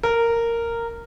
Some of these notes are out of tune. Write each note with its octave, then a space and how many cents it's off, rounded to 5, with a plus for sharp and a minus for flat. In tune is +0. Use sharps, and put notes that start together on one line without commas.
A#4 -10